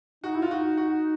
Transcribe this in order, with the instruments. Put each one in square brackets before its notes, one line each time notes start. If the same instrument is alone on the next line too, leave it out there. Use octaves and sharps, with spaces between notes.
[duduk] D#4 [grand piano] F#4
[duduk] E4
[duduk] D#4 [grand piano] F4
[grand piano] F#4
F#4